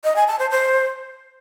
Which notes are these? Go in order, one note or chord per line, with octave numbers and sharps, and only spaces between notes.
D#5
G#5
A5
C5
C5